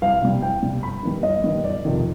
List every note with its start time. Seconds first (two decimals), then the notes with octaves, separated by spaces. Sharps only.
0.02 C2 F5
0.22 C3 G3
0.42 C2 G5
0.62 C3 G3
0.83 G1 B5
1.03 G2 D#3 G3
1.23 G1 D#5
1.44 G2 D#3 G3
1.64 G1 D5
1.85 F2 C3 D#3